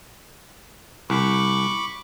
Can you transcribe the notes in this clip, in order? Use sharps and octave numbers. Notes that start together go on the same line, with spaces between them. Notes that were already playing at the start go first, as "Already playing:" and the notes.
C2 B5 C#6 D6